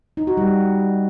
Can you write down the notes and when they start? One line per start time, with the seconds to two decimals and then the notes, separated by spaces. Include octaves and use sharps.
0.17 D#4
0.27 F#4
0.37 G3